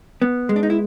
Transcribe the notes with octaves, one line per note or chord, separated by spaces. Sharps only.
B3
G#3
D4
D#4
E4